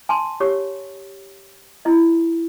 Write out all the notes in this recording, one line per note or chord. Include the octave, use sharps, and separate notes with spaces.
G#5 A5 C6
G4 C#5 C#6
E4 D#5